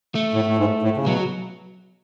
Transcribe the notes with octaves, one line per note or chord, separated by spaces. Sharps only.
A3
A2
A2
G#2
A2
C#3
B2 F#3